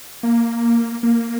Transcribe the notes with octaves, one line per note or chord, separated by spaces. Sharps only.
A#3
A#3